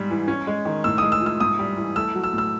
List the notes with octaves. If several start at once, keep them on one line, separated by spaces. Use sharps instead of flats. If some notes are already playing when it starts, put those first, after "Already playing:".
Already playing: G#2 G3
E3
C#4
G#3
D#3
A2 E6
G#3 D#6
E6
F3
E6
G#2 D#6
G3
E3
A3 E6
F#3
E6
A2
E6